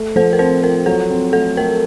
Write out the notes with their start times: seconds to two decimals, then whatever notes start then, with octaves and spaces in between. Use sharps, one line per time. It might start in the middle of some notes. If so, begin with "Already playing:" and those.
Already playing: A3
0.16 F3 A4 C5
0.33 A#4
0.39 C4 A4 C5
0.63 F4 A#4
0.86 F#3 A4
1.10 C4
1.33 A3 A4
1.57 A3 A#4